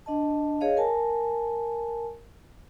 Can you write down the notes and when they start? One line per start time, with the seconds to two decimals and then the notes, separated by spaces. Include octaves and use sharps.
0.06 D4 D#5 A5
0.61 G#4 C#5 D#5 F5
0.77 A#4 G#5 A5